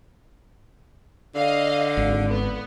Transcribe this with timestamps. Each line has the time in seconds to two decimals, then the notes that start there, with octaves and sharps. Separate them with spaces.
1.35 D3 D#5 F5
1.97 G#1
2.29 B3